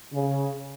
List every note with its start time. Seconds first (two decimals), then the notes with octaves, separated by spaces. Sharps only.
0.13 C#3